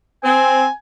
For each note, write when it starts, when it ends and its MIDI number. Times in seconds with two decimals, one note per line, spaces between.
0.24 0.65 60
0.24 0.72 80